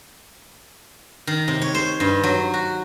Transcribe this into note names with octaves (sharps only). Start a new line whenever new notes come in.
D#3
C3
C#5
C5
G2
F#3
F#4